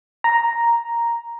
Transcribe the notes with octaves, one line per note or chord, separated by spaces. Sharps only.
A#5